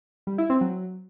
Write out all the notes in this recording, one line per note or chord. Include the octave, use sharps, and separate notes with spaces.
G3
E4
C4
F#3